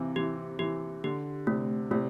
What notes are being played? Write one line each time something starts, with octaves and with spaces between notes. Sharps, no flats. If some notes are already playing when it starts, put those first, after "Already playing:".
Already playing: C3 E3 C4
E3 G4
E3 G4
D3 G4
C3 A3
C3 A3